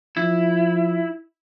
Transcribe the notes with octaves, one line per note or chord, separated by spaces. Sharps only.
F3 E4